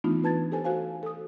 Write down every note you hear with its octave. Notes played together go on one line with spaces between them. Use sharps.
E3 A3 B3 D4 D#4 F4
B4 A5 G#6 A6
G4 A4 C5 G#5
F#4 C5 F5 G#5
A4 D#6